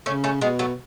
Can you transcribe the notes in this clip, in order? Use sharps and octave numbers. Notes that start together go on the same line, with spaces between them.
C#3 A3 C#4
A3 C#4
B2 G#3 B3
F#3 A3